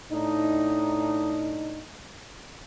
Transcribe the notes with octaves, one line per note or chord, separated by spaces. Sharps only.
A2 D4 D#4